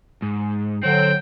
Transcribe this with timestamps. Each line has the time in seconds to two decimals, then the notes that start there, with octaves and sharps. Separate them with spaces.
0.22 G#2
0.83 D3 F#3 C4 G5